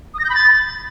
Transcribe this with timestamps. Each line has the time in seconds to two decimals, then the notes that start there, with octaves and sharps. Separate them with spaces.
0.14 D#6
0.19 A#6
0.24 G6
0.30 B5
0.35 A6